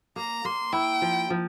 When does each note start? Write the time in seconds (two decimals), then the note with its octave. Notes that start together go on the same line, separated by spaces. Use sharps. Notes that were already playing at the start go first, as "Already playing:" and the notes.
0.16 A#3 A#5
0.45 A#3 C6
0.73 E4 G5
1.02 F3
1.30 F3